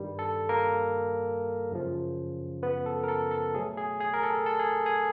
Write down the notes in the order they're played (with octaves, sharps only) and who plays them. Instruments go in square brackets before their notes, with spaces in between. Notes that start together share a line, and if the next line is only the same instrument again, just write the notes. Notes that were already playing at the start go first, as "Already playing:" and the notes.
Already playing: [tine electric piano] G2 D#3 G3
A4
A#3 A#4
F#2 C#3 F3
B3 B4
A4
A#4
A4
A4
B2 F#3 A3 G#4
G#4
G#4
A#4
A4
A4
G#4
G#4